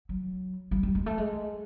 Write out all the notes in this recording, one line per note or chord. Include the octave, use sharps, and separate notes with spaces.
F#3
G3
G3
G#3
A3
G#3